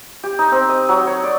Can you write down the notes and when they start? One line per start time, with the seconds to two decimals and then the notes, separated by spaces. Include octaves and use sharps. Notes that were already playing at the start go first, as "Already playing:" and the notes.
0.23 G4
0.39 D#4
0.51 C4
0.69 D#5
0.89 F#3
1.07 C#5
1.24 D5